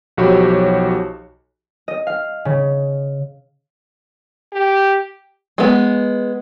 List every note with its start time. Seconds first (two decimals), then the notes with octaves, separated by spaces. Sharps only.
0.17 B1 F3 F#4 G4 C#5 B5
1.88 D#5
2.07 F5
2.45 C#3
4.52 G4
5.58 G#3 B3